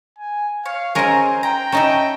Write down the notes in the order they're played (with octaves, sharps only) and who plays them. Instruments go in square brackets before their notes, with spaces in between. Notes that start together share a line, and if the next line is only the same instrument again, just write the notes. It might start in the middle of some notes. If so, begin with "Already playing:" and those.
[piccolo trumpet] G#5
[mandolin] C#5 [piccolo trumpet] F5
[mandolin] C4 G#4 [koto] C#4 A#4 D#5 [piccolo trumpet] C5
[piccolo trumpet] G5 [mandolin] A#5
[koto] C#4 D#4 E4 [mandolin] A5 A#5